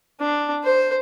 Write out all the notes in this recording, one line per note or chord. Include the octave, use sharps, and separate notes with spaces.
D4
C5